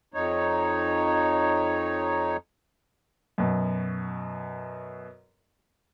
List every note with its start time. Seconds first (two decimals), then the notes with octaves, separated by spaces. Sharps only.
0.14 F2 D#4 C#5
3.38 F#2 B2